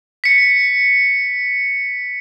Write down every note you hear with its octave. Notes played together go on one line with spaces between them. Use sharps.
B6 C#7